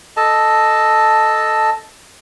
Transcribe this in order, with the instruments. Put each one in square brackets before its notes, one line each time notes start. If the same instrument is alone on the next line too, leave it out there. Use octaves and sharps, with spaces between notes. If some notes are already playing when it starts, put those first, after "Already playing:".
[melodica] A4 D#5 A5